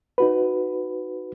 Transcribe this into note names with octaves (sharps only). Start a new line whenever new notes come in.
D#4 F#4 B4